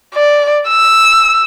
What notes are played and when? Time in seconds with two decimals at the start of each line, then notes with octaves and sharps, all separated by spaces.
0.14 D5
0.68 E6